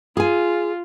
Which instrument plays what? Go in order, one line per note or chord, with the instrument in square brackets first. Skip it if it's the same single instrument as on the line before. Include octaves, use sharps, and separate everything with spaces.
[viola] F4 [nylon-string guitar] G#4 G#5